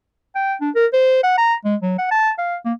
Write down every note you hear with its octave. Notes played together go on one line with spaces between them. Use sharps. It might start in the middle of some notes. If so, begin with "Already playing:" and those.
G5
D4
A#4
C5
F#5
A#5
G#3
F#3
F#5
A5
F5
A#3